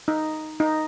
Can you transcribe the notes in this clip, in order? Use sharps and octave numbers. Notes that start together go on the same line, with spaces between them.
D#4
D#4